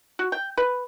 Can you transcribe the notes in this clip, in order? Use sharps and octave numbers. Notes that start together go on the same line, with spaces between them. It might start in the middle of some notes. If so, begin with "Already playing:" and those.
F#4
G5
B4